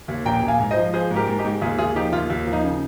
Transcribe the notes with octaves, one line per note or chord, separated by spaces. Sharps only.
D#2
A#1 G5 A#5
A#1
F5 G#5
G#2
C5 D#5
F3
F3 G#4 C5
G#2
G4 A#4
G#2
D#4 G4
G#2
D#2 F4 G#4
D#2 F4 G#4
F3 D#4 G4
D#2 F4
D#2
F3
D#4
C#3